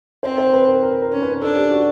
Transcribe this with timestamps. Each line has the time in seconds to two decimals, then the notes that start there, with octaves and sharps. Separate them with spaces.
0.23 C4 C5
0.38 C5
0.53 B4
0.67 A#4
0.83 A#4
1.02 A#4
1.12 C#4
1.22 B4
1.42 D4 A4
1.56 G4
1.71 F#4